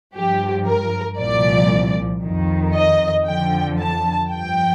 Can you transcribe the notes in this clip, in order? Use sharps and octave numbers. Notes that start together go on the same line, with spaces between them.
G2 F3 G4
A#4
C2 A#2 F3 D5
F2 D#3
D#5
F2 D3 F3 G5
A5
G2 F3 G5